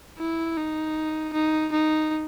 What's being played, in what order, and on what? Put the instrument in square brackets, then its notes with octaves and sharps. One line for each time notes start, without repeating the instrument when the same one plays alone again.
[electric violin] E4
D#4
D#4
D#4